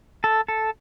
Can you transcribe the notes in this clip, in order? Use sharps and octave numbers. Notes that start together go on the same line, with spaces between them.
A4
A4